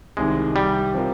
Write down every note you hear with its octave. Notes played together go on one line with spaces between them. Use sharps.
C2 C3 D#3 G#3
G3
C3 F3 C4 F4 A#4